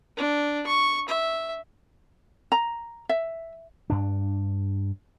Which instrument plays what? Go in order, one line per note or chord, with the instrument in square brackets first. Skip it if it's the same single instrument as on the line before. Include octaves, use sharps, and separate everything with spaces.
[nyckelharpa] D4
C#6
E5
[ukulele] A#5
E5
[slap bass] G2 D4